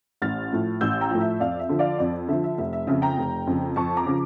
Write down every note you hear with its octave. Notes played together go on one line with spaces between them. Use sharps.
A1 F6 A6
A2 F3
A1 E6 G6
G5 A#5
A2 F3
E5
F2 D5 F5
E5
D3 F3
D5 F5
F2 D5
D3 F3 E5
E5
F1 E5
E5
F2 C#3 E5
G5 A#5
F1
F2 C#3
F2 A5 C#6
A#5 D6
C#3 F3